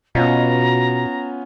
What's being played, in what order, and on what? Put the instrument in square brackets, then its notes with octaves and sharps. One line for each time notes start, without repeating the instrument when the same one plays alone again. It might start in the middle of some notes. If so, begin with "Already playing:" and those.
[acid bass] B2 [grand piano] B3 C#4 F4 [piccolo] A#5